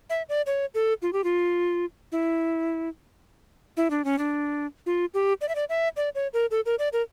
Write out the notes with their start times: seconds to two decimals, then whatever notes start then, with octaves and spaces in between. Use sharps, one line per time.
0.10 E5
0.29 D5
0.46 C#5
0.74 A4
1.02 F4
1.13 G4
1.24 F4
2.12 E4
3.77 E4
3.90 D4
4.05 C#4
4.18 D4
4.86 F4
5.14 G4
5.41 D5
5.49 E5
5.55 D5
5.69 E5
5.97 D5
6.15 C#5
6.33 A#4
6.51 A4
6.66 A#4
6.79 D5
6.93 A#4